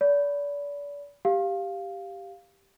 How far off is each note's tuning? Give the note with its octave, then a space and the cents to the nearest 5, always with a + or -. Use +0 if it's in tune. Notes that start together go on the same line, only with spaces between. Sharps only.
D5 -35 B5 +0
G4 +0 F5 +0